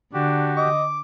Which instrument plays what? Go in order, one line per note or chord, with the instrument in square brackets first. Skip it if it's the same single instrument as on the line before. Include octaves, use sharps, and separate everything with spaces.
[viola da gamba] D3 [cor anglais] D4 [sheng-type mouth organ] F#4 G4
[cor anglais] D#5 [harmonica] D6